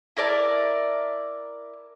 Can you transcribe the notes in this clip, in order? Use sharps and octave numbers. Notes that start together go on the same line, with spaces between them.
E4 A#4 D5 A5